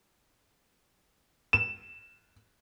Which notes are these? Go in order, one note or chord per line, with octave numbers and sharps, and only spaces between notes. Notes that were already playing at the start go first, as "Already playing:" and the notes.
E7